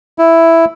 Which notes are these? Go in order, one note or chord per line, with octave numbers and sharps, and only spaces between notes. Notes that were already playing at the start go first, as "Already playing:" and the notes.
E4